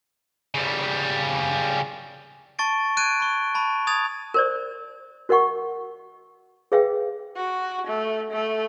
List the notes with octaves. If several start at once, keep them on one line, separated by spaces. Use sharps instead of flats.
C#3 G3
A5 C#6 A6 D7
F#6 G#6 D7 D#7
B5 C#6
A5 B5 C#6
B5 D#6 G#6 A6 F7
A#4 C5 D5
F#4 A#4 D#5 F#5 C#6
G#4 B4 E5 F5 G5
F#4
A3
A3